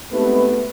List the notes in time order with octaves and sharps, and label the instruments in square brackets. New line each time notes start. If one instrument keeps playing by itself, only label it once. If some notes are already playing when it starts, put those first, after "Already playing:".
[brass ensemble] G#3 C4 D#4 G4 B4 [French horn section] A3 B3